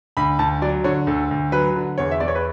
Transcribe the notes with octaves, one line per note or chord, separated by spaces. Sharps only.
D2 B5
D2 A5
F#3 D5
D3 C#5
D2 A4
D2
F#3 B4
D3
E2 C#5
E5
E2 D5
C#5
B4